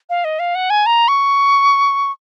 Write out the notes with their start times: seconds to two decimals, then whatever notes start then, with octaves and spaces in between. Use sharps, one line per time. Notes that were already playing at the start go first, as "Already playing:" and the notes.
0.10 F5
0.24 D#5
0.39 F5
0.55 F#5
0.70 G#5
0.86 A#5
1.08 C#6